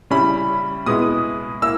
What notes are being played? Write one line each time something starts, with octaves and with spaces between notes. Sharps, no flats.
C#3 G3 C#4 E4 B5
B2 G#3 B3 E4 D#6
A#3 E4 E6